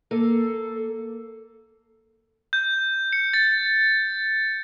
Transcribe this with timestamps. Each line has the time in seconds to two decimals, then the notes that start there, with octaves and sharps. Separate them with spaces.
0.11 A#3 A4
2.53 G6
3.13 C#7
3.34 A6